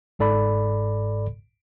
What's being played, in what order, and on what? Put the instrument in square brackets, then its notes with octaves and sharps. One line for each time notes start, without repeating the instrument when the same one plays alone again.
[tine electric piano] G1 G#2 A4 D5 B5